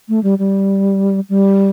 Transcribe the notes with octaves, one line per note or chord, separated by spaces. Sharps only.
A3
G3
G3
G3